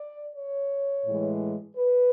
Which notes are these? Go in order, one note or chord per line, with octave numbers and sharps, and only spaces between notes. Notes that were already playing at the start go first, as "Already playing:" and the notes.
Already playing: D5
C#5
A2 E3 G#3
B4